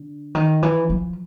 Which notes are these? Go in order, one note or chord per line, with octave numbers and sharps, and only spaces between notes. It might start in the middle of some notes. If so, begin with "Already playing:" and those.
Already playing: D3
D#3
E3
F3